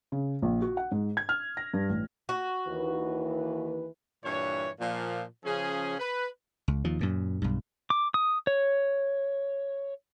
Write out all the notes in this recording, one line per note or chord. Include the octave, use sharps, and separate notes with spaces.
C#3
A#1
F#4
F#5
G#2
G#6
F6
A#6
G2
A1
F#4
D#2 E3 B4
G2 A#2 E3 C#5
A#2 F3
C#3 F3 C#4 G#4
B4
C#2
D#2 F3
F#2 A#2
B1 G2
D6
D#6
C#5